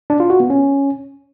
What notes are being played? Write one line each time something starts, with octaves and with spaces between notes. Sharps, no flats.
D4
F4
F#4
B3
C#4